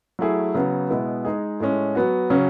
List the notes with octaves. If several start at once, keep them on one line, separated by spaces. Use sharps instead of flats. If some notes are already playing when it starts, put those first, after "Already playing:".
F#3 A3 E4 G#4
C#3 F#3 B3
B2 G#3 B3 E4
G#3 D#4 G#4
A2 G#3 C#4
F#3 B3 F#4
C#3 F#3 C#4